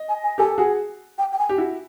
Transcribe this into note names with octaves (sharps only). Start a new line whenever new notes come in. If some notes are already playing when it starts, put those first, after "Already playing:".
Already playing: D#5
G#5
G#5
G4 A4 G#5
F#4 G#4 G#5
G5
G5
G#5
G4
E4 F#4